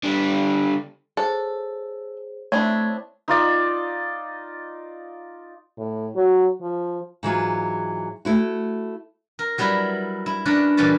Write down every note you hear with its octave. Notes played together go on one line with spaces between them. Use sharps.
D3 G3
G#4 A4 C5 C#5
A3 C4 D4 E4 C#5
D#4 F4 D5 D#5
A2
F#3
F3
G#2 E3 F#3 F4
A3 E4 F#4
A#4
F#3 G3 E4 A#4 B4
E4
C#4 D4 A#4 B4 D5
A#2 E3 G3 C#4 B4 A5